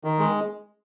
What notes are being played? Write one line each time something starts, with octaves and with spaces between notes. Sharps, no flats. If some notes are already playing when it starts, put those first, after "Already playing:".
D#3
G#3